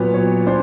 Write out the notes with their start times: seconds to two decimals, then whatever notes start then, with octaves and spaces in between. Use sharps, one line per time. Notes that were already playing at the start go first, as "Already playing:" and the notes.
Already playing: A#2 F#3 B3
0.14 C#5
0.47 D4 C5